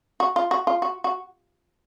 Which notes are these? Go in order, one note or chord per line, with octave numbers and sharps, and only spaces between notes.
F#4
F4
F#4
F4
F#4
F#4